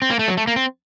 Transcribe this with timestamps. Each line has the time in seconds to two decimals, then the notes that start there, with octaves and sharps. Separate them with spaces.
0.02 C4
0.10 A#3
0.19 A3
0.28 F#3
0.37 A3
0.47 A#3
0.56 C4